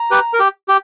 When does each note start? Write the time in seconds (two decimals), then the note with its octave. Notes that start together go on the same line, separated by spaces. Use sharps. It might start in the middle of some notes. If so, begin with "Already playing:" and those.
Already playing: A#5
0.11 G4 B4
0.34 A#4
0.40 G4
0.69 G4